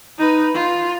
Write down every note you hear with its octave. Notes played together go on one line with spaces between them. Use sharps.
D#4 B4
F4